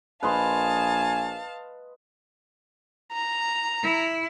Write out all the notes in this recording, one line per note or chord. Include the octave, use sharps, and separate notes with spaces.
A#1 B4 D#5 F5 G#5 A5 C6
A#5
E4